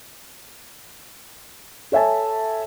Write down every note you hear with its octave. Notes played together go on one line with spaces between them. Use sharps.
A4 C#5 E5 G#5 A5